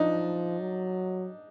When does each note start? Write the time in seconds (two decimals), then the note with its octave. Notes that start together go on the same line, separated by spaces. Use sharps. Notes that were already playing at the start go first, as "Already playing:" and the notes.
Already playing: F3 D4 D#4
0.61 F#3